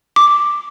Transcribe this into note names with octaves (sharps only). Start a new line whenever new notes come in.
D6